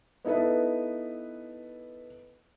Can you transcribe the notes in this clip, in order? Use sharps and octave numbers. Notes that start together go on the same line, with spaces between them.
B3 D#4 E4 A4 B4